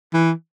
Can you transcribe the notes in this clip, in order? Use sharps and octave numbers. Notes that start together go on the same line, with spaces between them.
E3